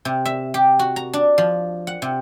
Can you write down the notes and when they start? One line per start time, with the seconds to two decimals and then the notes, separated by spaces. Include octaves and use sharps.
0.05 C3
0.25 E5
0.54 G4
0.79 F#4
0.96 A#5
1.13 D4
1.38 F3
1.87 F#5
2.02 C3